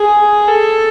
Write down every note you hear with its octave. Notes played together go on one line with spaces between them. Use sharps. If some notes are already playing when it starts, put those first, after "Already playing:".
Already playing: G#4
A4